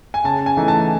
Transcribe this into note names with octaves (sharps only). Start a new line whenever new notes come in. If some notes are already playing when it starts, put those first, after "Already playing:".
G#5
C#3 A5
G#5
E3 A3 D#4
A5